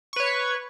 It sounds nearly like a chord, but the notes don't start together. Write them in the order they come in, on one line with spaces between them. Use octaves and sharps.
C#6 B4 C#5